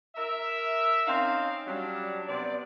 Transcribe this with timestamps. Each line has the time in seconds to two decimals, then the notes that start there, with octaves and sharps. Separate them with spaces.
0.16 A#4 E5
1.07 C4 C#4 D#4 F5
1.67 F#3 G3 C#4 D4
2.27 C3 B3 D5